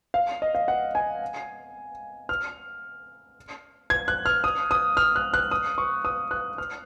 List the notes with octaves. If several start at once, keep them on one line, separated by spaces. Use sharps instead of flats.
F5
D#5
F5
F#5
G#5
F6
G#6
F#6
F6
D#6
D#6
F6
F#6
F#6
D#6
C#6
D#6
F#6
F6